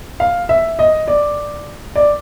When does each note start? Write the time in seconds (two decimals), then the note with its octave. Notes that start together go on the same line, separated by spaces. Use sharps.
0.20 F5
0.49 E5
0.79 D#5
1.08 D5
1.96 D5